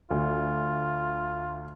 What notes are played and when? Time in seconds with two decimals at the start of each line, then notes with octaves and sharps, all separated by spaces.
0.11 D2 F4